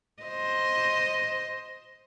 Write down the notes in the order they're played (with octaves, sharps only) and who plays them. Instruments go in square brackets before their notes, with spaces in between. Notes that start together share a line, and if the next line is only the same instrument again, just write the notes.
[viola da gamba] C5 D#5